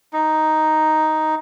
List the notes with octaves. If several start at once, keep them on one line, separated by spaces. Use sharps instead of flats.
D#4